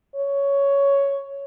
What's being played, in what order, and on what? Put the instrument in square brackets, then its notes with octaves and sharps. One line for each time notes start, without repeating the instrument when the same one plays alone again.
[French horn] C#5